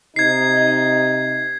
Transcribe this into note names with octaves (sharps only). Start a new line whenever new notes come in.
C3 D#4 G#6 C7